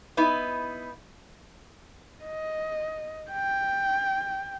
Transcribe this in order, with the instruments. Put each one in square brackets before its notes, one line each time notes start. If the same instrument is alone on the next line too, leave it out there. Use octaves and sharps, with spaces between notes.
[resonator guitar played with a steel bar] B3 D#4 E4
[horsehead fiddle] D#5
G5